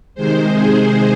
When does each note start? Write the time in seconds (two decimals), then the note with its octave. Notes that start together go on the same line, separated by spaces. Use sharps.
0.15 C3 D#3 G#3 C5
0.51 G#4